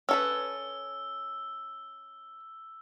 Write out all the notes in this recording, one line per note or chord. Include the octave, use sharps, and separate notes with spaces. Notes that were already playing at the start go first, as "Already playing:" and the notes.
C#4 A4 B4 E6